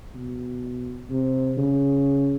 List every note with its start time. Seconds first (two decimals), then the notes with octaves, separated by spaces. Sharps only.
0.15 B2
1.10 C3
1.58 C#3